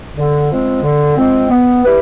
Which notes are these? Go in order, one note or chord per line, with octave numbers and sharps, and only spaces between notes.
D3
F3 G#3 C4
D3
F3 G#3 C4
B3
E4 G4 B4